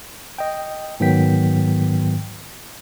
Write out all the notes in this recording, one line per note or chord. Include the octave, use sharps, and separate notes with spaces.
D#5 G5
G#2 D#3 F#3 B3 G5 B6